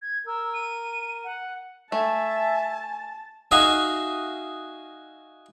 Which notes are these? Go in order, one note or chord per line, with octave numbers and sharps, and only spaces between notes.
G#6
A#4 E6
D#7
F#5
A3 E5 G#5 A5
D#4 F#4 G#4 E5 F5